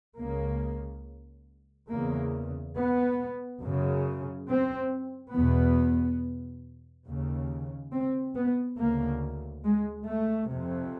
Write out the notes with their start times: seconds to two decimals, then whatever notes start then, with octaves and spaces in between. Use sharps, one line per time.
0.18 C#2 C#3 A#3
1.89 E2 C#3 A#3
2.76 B3
3.62 F#2 C#3
4.48 C4
5.33 E2 B2 B3
7.05 D#2 C#3
7.91 C4
8.35 B3
8.77 D2 C#3 A#3
9.64 G#3
10.06 A3
10.49 F2 C3